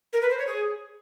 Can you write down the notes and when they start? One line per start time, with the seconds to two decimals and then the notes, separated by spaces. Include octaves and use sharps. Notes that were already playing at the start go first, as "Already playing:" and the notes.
0.13 A#4
0.21 B4
0.30 C5
0.38 C#5
0.47 G#4